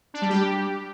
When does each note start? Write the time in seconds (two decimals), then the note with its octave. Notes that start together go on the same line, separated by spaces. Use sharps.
0.14 D4
0.22 G3
0.29 G4